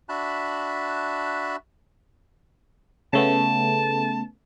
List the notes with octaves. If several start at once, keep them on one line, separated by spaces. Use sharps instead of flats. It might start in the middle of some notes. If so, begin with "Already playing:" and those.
D4 F#4 E5 A5 B5 F#6
C#3 A3 B3 A5